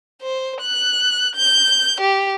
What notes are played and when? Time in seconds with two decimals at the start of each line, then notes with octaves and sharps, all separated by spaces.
0.22 C5
0.62 F#6
1.36 G6
2.01 G4